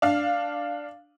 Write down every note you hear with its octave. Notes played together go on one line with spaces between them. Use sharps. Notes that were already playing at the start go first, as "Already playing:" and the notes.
D4 F5